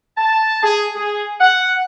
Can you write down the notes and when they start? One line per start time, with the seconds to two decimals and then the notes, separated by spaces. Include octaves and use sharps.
0.17 A5
0.63 G#4
0.95 G#4
1.41 F#5